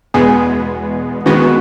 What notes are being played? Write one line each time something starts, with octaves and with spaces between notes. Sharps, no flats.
E2 B2 G#3 B3 G#4
D#2 D#3 G#3 B3 F#4